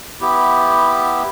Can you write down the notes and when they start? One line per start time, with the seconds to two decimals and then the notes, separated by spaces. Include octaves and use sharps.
0.21 B3 E4 G4